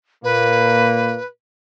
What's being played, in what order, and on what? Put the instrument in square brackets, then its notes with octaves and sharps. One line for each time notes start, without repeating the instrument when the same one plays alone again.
[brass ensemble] A#2 A#3 [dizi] B4